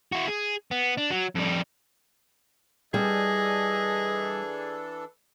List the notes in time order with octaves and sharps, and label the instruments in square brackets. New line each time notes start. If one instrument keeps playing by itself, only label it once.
[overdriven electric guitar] E4 F#4
G#4
B3
D4
F#3
F2 G3
[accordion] E3 D4 A4 [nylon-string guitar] G3 [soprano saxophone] G#4 [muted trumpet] D#5